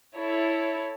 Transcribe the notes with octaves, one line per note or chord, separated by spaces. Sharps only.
E4 A4 C#5